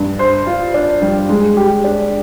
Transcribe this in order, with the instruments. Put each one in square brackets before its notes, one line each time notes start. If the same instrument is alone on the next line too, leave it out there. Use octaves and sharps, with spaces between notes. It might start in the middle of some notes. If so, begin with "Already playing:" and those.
Already playing: [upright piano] G2
C5
F4
D4
G3
G#3
G4
D4